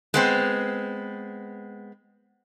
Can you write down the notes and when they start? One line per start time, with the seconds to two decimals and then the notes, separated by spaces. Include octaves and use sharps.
0.14 G#3 B3 C4